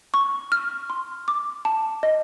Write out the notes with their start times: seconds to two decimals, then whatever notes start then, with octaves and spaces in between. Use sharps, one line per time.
0.14 C#6
0.52 F6
0.90 C6
1.28 D6
1.65 A5
2.03 D#5